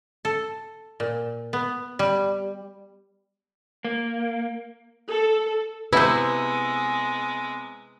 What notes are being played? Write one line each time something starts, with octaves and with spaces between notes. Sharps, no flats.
A4
A#2
B3
G3
A#3
A4
C3 G#3 B3 E4 B4 C5 E6